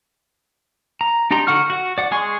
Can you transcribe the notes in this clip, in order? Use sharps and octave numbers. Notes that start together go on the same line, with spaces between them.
A#5
D4 D#4 G4 A#5 C6
D3 F#4 F#5 C#6 F6
F#4 F#5
D5 F#5
G#3 G#4 G#5 C6 C#6